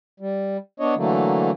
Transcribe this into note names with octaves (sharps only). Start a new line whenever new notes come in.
G3
B3 D4 C#5 D#5
D3 E3 F#3 A3 A#3